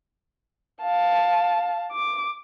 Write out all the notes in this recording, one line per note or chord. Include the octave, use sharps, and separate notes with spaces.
F5 A5
D6